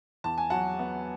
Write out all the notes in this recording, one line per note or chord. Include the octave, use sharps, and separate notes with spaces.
E2 A5
G#5
F#3 F#5 A5
B3